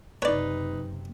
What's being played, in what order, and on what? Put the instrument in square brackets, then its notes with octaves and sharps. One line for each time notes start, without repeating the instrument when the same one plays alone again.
[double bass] F#1 C3 [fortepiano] D#4 B4 [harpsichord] C#5 D5